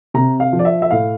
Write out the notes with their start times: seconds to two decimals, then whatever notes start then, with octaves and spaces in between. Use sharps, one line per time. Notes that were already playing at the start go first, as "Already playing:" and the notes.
0.14 C3 A#5
0.40 F5
0.53 F3
0.59 D5
0.65 E5
0.82 E5
0.91 A2 F5